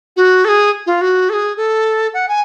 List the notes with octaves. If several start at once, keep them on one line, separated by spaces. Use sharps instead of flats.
F#4
A4
G#4
F4
F#4
A4
G#4
A4
F#5
G#5